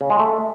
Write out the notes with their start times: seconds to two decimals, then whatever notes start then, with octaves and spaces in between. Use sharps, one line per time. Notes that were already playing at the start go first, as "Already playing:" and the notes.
0.01 C#3
0.10 G#3
0.19 A3